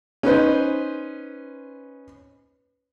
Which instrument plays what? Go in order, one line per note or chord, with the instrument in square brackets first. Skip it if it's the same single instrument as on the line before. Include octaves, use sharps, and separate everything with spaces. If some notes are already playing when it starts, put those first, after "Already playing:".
[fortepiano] C#4 D#4 B4 C5